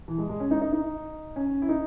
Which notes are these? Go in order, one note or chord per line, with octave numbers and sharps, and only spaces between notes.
E3
G#3
G#3
C#4
D#4
D#4
D#4
C#4
E4
D#4